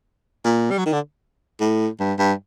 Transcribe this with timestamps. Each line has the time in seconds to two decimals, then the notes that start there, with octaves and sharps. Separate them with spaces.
0.44 A#2
0.71 G3
0.78 F#3
0.86 D#3
0.93 D3
1.60 A2
1.99 G2
2.19 G2